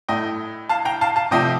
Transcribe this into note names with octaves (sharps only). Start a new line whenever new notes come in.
A2 A3 D#5 G5
F5 A5
G5 A#5
F5 A5
F5 A5
C3 F3 A3 D#5 G5